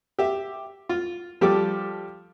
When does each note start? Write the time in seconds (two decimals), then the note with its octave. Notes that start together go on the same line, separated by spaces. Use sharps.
0.19 G4 E5
0.89 F4
1.41 F3 G3 G4 A4 D6